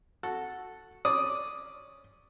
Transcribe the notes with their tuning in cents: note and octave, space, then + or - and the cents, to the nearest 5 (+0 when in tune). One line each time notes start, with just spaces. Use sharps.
F#4 -5 A4 +0
C#4 +0 D5 +0 D#6 +0